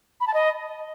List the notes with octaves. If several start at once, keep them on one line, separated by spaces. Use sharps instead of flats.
B5
A5
D#5